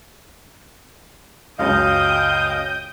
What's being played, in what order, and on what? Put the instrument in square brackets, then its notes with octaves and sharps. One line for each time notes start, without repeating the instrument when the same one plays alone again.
[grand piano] C#2 F#2 C#3 [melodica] D#5 F5 [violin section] G5 D#6 G6